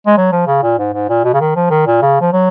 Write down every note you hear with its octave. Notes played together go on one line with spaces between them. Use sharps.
G#3
F#3
F3
C#3
A#2
G#2
G#2
A#2
B2
C#3
D#3
F3
D#3
A#2
C#3
F3
F#3